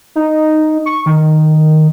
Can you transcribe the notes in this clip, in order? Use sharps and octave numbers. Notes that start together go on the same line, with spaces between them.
D#4
C#6
D#3